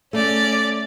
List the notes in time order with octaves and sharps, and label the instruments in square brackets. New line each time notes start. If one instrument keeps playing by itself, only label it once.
[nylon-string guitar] A3 [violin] C#4 D5